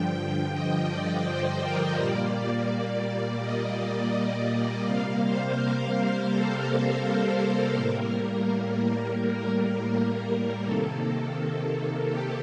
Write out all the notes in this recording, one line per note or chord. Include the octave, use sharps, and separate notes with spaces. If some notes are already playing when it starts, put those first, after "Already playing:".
Already playing: G2 D3 F3 G5
D#5
D5
C5
A#4
A#2 G3 A#3 D5
D#5
C3 G3 A#3 F5
C5
A#4
A4
A4
A2 G3 A#3 A#4
C3 D#3 A#3 A4
G4